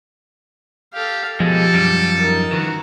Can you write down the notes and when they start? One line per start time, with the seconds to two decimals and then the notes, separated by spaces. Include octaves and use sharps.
0.94 G4 A4 F5
1.40 B2 F3 G#3 G4 A4
1.74 F#2 G3
2.18 D#4 A#4
2.51 D#3 E3 F#4